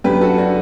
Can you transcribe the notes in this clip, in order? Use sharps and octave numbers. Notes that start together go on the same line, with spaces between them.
F#2 D3 G4 B4
F#4 A4
D4 F#4